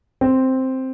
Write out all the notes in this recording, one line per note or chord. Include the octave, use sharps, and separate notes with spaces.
C4